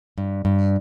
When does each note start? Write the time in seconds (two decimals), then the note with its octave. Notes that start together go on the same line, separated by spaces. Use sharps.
0.18 G2
0.45 G2